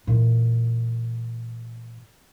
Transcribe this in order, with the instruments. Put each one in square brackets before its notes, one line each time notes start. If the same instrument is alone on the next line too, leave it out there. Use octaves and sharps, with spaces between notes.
[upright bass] A#2 E3